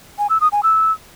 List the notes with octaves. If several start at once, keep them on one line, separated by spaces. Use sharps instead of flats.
G#5
E6
D#6
G#5
E6